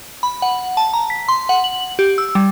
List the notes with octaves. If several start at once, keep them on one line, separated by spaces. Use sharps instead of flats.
B5
F#5
A5
A#5
B6
C6
F#5
F#7
G4
E6
G3